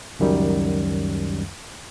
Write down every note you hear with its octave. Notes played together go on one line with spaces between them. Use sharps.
C#2 F#2 D#3 G3